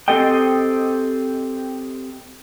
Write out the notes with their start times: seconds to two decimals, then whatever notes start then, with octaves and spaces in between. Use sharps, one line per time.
0.08 C4 G4 A4 C5 D#5 G5